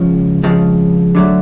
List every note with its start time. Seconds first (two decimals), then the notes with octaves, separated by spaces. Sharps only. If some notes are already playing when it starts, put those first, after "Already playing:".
Already playing: C#2 C#3 F3
0.43 F2 C#3 F3 G#3
1.15 D3 F#3 A3